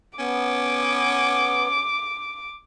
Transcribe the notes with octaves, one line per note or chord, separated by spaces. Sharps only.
B3 C#4 D6